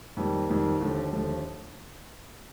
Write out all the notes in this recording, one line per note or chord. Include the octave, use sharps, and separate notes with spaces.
F2 D#3 G3 A#3
F2 D#3 G3 A#3
D#2 D3 F3 A3
D#2 D3 F3 A3